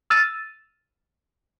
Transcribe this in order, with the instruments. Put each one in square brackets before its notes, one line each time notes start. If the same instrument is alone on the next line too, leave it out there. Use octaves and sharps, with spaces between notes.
[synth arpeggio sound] E6 F6 A6 D#7 E7